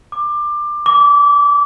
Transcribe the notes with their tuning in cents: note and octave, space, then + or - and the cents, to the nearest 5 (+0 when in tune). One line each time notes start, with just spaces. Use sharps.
D6 +20
D6 -25